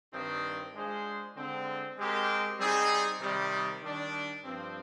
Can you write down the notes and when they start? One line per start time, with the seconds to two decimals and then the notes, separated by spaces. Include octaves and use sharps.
0.13 G2 D#3 G3 C4
0.75 G#3 D4 F4 G#4 C5
1.37 D3 G#3 C4
1.98 G#3 C4 G4 A#4
2.60 G3 C4 D#4 G#4
3.20 C3 D#3 G3
3.82 D#3 G3 D4
4.44 G2 F3 C4